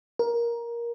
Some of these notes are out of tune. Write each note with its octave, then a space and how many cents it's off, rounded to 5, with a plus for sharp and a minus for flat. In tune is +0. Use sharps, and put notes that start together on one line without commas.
A#4 +15